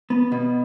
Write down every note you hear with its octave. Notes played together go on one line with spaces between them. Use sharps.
B3
B2